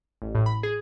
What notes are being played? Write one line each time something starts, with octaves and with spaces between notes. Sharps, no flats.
A1
A2
B5
G#4